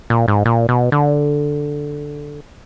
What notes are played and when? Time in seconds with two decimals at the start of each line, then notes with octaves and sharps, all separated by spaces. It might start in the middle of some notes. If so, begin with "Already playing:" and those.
0.10 A#2
0.28 G#2
0.45 A#2
0.69 B2
0.92 D3